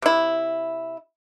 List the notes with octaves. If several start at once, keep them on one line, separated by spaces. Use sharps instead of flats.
C3 E4